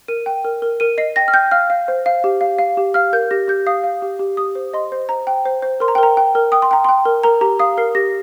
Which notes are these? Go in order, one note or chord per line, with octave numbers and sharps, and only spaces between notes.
A#4 D#7
G5
A#4
A#4
A#4 D#7
D#5 C7
G5 A#6
F6
G5 G6
F5 F6
F5
C5
F5
G4
F5
F5
G4
F5 F6
A#4 G6
G4 A#6
G4 G6
F5 D#6
F5
G4
G4
G4 D#6
C5
D#5 C6
C5
C5 A#5
G5
C5
C5
A#4 C6
A#5
G5
A#4 A#5
G5
A#4
G5 D#6
C6
G5 A#5
G5 C6
A#4
A#4 A#5
G4 A#5
F5 D#6
A#4 C7
G4 A#6